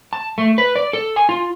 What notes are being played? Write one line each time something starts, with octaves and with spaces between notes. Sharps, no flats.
A5
A3
B4
D5
A4
G#5
F4